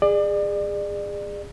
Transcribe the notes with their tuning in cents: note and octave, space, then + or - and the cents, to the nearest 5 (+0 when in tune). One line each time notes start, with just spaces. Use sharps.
G#4 -20 D5 +30